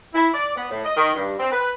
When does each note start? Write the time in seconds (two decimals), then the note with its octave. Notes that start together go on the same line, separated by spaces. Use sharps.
0.14 E4
0.33 D5
0.56 B3
0.70 A2
0.85 D#5
0.97 D#3
1.16 G2
1.39 C4
1.51 B4